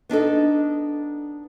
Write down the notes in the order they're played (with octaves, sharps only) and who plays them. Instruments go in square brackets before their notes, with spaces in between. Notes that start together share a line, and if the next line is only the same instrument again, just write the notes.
[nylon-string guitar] B3 D4 D#4 A4